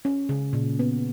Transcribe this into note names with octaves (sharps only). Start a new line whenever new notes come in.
C#4
C#3
A#2
B3